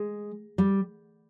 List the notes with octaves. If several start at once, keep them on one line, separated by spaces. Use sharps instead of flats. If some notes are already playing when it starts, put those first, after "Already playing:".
Already playing: G#3
G3